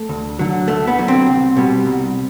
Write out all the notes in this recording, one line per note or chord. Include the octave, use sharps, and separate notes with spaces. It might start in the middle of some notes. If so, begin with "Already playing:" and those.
Already playing: A3
D2
D3 F#3
D2 A3
B3
D3 F#3
C4
C2
B2 G3
C2